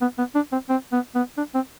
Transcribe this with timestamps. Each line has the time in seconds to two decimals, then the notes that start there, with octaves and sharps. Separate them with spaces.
0.01 B3
0.18 B3
0.35 D4
0.52 C4
0.69 C4
0.92 B3
1.15 B3
1.37 D4
1.54 C4